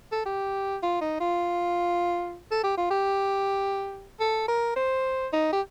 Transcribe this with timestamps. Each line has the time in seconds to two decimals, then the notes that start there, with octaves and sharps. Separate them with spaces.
0.12 A4
0.26 G4
0.83 F4
1.01 D#4
1.20 F4
2.51 A4
2.64 G4
2.77 F4
2.90 G4
4.20 A4
4.48 A#4
4.76 C5
5.33 D#4
5.53 G4